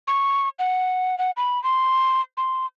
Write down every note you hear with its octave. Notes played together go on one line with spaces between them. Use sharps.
C#6
F#5
F#5
B5
C6
C6